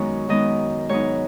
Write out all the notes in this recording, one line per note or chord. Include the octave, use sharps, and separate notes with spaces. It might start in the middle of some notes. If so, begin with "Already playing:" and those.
Already playing: F#2 D#3 G#3 B3 D#4 C#5
F#2 D#3 G#3 B3 D#4 D#5
G#2 F#3 B3 D#4 C#5